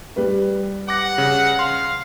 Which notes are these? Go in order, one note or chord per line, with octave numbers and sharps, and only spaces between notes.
G3 B4
F#5 D6 A#6
C#3
F5 C6